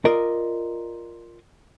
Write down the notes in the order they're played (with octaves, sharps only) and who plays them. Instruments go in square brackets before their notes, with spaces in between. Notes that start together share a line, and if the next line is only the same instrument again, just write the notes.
[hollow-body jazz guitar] F4 A#4 D5 D#5